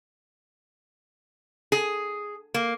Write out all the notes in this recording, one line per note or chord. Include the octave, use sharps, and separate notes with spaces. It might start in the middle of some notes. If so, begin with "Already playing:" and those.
G#4
A#3